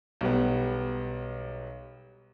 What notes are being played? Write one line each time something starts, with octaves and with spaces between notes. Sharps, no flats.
B1 G3 B3